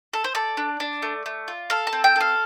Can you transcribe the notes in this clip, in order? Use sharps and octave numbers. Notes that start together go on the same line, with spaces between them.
A4
C5
A4 D5
D4
D4
A3
A3
F4
A4 F5
A5
C4
G5
A4 F5